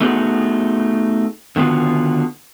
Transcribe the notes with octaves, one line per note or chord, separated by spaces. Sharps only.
A3 B3 D#4 F#4 G#4
D3 D#3 B3 F4 F#4